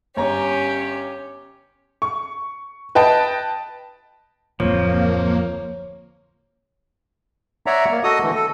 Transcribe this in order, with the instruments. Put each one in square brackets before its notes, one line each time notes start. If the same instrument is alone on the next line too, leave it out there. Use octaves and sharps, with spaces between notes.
[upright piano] G1 C#5 A#5 [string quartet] C#4 G4
[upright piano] C#6
B4 D#5 G5 A5
[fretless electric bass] D1 F2 [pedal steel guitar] F3 [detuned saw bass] A#3 [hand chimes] C#5
[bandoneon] C#5 D5 E5 F#5 A#5
A#3
F#4 A4 D#5 D#6
D3 E3 A3
A4